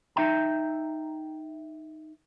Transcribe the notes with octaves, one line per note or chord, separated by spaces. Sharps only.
D#4 E5 G5 A#5